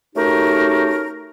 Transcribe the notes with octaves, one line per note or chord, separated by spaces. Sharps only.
A3 C#4 D#4 F#4 G4 A#4